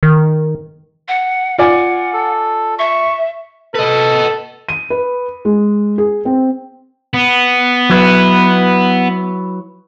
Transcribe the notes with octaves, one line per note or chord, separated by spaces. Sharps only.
D#3
F#5
F4 D5 F#5 G#5
A4
E5 C#6
A4 B4 D#5
D#7
B4
G#3
G#4
C4
B3
F#3 E4 B4